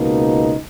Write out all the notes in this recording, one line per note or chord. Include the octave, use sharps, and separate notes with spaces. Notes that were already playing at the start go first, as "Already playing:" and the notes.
Already playing: C#2 B2 A#3 D#4